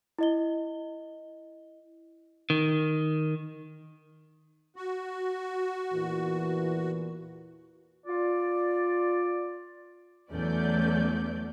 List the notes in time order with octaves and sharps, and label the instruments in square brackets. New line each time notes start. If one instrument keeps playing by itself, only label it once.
[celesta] E4 D#5 G7
[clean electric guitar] D#3
[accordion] F#4
[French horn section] E2 A#2 E3
[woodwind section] F4 D5
[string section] E2 F#3 A3 C#4 D5 G6